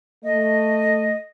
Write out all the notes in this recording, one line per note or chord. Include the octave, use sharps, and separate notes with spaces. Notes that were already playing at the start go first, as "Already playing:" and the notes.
A3 D#5